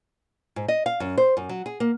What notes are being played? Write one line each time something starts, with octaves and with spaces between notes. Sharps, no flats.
G#2
D#5
F5
F#2
C5
F#2
F#3
G#4
A#3